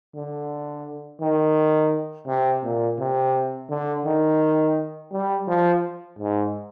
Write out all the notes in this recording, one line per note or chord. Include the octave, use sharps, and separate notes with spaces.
D3
D#3
C3
A#2
C3
D3
D#3
G3
F3
G#2